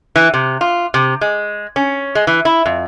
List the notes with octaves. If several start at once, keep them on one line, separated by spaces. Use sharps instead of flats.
E3
C3
F4
C3
G#3
C#4
G#3
E3
E4
F2